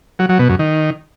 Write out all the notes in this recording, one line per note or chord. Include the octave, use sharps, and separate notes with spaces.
F#3
F#3
B2
F#2
D#3